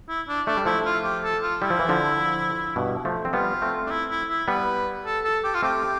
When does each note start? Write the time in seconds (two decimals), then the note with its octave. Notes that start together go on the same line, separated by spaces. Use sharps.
0.09 E4
0.28 D4
0.47 A3 D4
0.57 G3
0.65 F3 A3 E4
0.85 F4
1.04 G4
1.24 A4
1.42 F4
1.62 G3 E4
1.70 F3
1.79 E3
1.89 D3 F3
2.76 G2 B2
3.05 F3 A3
3.25 C4
3.33 G3 B3 F4
3.62 A3 C4
3.86 D4
3.90 E4
4.11 E4
4.30 E4
4.48 G3 B3 B4
5.06 A4
5.24 A4
5.44 G4
5.54 F4
5.63 A3 C4 G4